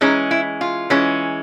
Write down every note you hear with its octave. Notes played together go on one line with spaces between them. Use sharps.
E3 G#3 C#4 D#4
E4
F4
E3 G#3 C#4